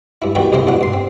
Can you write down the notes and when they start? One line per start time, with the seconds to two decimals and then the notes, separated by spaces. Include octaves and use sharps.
0.22 G2 E4
0.35 E2 D#3 G3 F#4 B4 G5
0.52 C2 F2 C#3 A#3 E4 C5
0.67 E2 B2 D4 F#5
0.81 G2 C6
0.93 C4